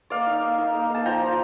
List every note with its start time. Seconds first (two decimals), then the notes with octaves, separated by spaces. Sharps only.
0.10 A#3 D5 F5
0.26 D#4
0.42 A#3
0.58 D#4
0.74 A#3
0.90 A#3 A5
1.05 F3 G5 A#5
1.21 F3